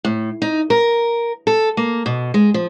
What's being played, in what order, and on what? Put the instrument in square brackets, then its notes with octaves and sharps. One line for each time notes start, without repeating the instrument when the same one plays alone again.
[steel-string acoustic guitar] A2
D#4
A#4
A4
A#3
B2
G#3
F3